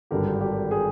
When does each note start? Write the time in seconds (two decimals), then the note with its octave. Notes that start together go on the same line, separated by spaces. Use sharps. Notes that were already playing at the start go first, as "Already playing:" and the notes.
0.11 G#1 G2 D3 G4 A#4
0.41 G4
0.71 G#4